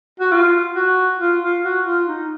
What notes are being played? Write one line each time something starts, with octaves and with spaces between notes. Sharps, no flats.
F#4
F4
F#4
F4
F4
F#4
F4
D#4